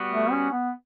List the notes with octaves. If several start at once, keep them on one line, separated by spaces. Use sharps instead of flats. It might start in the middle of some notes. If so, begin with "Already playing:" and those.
Already playing: G3 B3 F#4
A3
C#4
B3